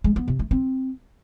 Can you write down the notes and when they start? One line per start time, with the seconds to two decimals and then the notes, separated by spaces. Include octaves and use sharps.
0.04 G#3
0.16 B3
0.28 C3
0.39 A3
0.51 C4